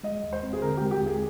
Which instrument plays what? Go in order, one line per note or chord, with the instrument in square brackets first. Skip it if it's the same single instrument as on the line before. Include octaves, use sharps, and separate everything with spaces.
[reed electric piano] G#3 [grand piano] D#5
[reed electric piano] D#2
[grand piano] C5
[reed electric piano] C4
[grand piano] G#4
[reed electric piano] D3 [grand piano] A#4
[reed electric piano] G#3 [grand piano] G4
[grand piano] G4
[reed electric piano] D#2 [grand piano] G#4